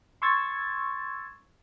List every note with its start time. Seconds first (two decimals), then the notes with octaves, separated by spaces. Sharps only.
0.22 C6 C#6 E6 G#6 A6